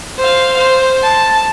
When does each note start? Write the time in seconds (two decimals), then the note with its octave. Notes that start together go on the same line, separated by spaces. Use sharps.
0.18 C5 F5
0.58 C5
1.03 A5